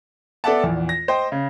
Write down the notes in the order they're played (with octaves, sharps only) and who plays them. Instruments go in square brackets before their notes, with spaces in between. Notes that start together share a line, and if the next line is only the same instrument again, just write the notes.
[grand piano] B3 A4 D5 E5 F#5 A5
A#1 E2
A#6
C5 D#5 G5
C#3